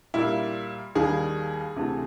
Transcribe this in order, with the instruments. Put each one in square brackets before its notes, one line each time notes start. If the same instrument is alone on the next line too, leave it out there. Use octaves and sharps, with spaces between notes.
[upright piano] A#2 G3 A#3 E4
D#2 D#3 G3 A#3 G#4
D2 C3 E3 A3